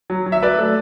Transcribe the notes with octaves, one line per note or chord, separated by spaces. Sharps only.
F#3
F#3
E5
F#3 B4 D5
A3